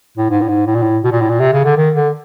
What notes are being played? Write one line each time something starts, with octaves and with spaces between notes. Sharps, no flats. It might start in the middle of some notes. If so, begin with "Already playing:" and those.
A2
G#2
A2
G#2
A2
A#2
A2
B2
A#2
A2
A#2
C3
C#3
D3
D#3
D3